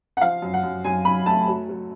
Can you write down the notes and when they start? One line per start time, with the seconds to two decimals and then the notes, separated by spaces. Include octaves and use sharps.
0.17 F#5
0.21 F3 F5
0.42 F#2
0.53 F#5
0.63 F#2
0.84 F#2 G#5
1.05 F#2 B5
1.26 A3 A5
1.48 F#3
1.69 F#3